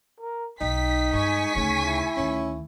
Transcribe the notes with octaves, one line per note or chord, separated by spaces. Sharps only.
A#4
B1 D#4 G5 B6
G2 G#3 G#5 C#6 B6
D2 C#3 D#4
E4
D2 D#3 C#4